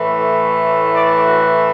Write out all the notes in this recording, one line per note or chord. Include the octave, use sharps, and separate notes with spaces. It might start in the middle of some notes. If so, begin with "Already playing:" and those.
Already playing: A2 E3 A3
D5
F#4